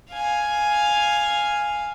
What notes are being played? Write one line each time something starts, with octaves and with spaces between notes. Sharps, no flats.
F5 G#5